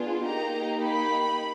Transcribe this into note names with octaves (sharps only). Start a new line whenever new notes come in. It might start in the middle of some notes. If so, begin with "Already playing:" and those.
Already playing: B3 D4 F4 G#4
A#3 D#4 G4 A#5
B5